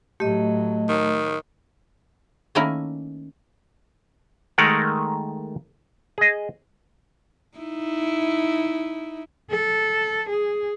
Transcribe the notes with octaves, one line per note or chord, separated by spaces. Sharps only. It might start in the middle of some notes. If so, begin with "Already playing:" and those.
A2 F#3 A3 G4 D#5
D#3
D#3 A3 A#3 C#4 E4 A#4
D#3 G#3 A3 A#4 F#5
G#4 D#5
D#4 E4
A4
G#4